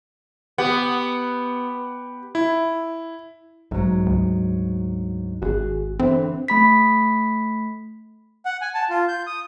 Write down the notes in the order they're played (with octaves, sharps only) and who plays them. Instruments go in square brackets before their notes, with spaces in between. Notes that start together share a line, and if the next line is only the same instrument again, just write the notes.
[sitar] B3 [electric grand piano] G4 F#5
[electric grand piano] E4
[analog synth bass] B1 [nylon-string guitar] G#2 F#3
[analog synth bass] D2
[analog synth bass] G#1 [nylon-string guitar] F#4 G#4
[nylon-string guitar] D3 E3 C5 [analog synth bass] C4
[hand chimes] A3 B5 B6
[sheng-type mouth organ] F#5
G#5
A5
F4
G6
D#6